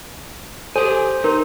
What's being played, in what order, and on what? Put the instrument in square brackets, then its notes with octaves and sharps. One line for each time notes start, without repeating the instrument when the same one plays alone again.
[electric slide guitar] G4 G#5 [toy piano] A4 [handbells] C5
[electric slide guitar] D#4 [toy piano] A#4 C6